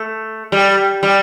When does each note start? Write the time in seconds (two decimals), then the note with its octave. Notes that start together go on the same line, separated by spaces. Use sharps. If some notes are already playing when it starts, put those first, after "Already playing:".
Already playing: A3
0.52 G3
1.03 G3